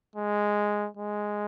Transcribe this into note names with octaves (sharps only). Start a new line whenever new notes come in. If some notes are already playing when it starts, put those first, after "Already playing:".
G#3
G#3